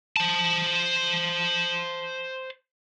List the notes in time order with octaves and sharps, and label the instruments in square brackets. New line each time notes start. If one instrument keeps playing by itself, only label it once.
[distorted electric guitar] C5 A5